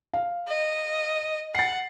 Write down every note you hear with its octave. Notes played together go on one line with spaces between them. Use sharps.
F5
D#5
F#5 A6 C7